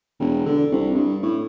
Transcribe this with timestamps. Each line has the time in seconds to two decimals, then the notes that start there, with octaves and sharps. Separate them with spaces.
0.20 E1
0.46 D3
0.71 C2
0.94 G2
1.23 A2